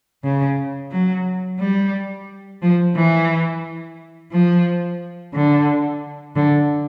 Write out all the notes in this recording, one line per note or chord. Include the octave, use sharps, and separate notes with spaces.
C#3
F#3
G3
F3
E3
F3
D3
D3